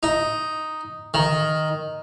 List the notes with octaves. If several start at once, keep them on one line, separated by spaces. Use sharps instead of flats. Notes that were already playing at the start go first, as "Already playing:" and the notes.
D#4
D#3